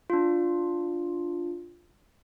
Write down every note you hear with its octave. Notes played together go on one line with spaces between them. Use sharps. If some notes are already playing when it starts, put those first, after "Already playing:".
D4 F4